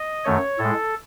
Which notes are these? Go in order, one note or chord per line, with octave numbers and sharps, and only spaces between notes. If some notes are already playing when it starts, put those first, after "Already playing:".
Already playing: D#5
F#2 D#3 A3 C#5
A2 G#3 A4